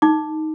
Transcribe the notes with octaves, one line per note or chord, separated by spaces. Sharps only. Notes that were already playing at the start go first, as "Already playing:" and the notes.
D#4 D6